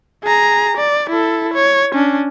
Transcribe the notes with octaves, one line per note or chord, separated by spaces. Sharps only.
G#4 A#5
D5
E4 A4
C#5
C#4 D4